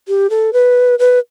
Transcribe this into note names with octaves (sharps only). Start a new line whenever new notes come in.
G4
A4
B4
B4